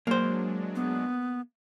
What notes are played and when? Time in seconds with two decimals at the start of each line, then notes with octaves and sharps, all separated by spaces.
0.07 F#3 G#3 A#3 D4 C5
0.75 B3